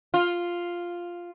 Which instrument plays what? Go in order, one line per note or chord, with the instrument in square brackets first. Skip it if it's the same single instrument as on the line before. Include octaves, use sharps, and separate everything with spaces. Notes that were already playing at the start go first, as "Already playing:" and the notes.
[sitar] F4